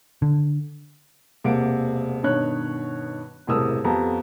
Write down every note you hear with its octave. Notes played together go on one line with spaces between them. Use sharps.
D3
E1 C3 A#3 F5 F#5 D7
G2 B2 D#3 D#4 C#5 F#6
E1 A2 C3 A#4 D#6 E6
F2 B3 G4 A4 A#5